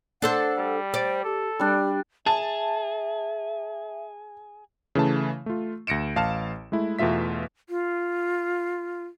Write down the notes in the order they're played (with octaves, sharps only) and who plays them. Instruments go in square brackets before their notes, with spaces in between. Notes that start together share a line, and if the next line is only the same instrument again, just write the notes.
[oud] D4 A4 C5 [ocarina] F#5
[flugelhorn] G3
[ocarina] C5 [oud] D5
[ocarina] G4 [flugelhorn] A4
[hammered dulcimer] G3 D4 [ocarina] G4
[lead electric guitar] G#4 [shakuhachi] E5 [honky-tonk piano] A5
[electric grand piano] C#3 E3 A3 A5
A3 F4
D2 A#6 C#7 D7 E7
A1 F5 A5 F6 E7
G#3 A3 E4
E2 B2 A3 F4 E5 B6
[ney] F4